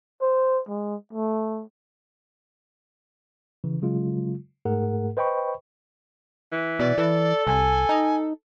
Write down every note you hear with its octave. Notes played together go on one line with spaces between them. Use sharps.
C5
G#3
A3
C#3 E3
C#3 F#3 G#3 F4
G#2 A3 G#4 A#4 F#5
B4 C5 D#5 G5 B5 C#6
E3
B2 D5
E3 A4
C2 G#5
D#4